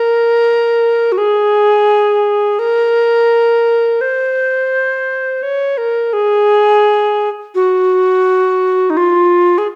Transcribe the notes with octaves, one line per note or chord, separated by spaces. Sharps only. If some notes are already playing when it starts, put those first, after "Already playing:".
Already playing: A#4
F#4
G#4
A#4
C5
C#5
A#4
G#4
F#4
D#4
F4
G#4